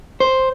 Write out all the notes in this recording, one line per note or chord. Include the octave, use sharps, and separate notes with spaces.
C5